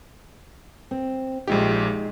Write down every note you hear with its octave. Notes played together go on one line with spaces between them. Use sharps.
C4
A#1 A#2 G#3 D#4 G4